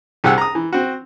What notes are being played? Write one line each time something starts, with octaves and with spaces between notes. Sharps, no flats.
C2 G4 G#4 F#5 E6
A#5 D#6
E3
C4 F#4